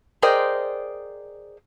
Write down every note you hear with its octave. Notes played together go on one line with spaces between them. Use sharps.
G#4 A#4 C5 D5 D#5 G5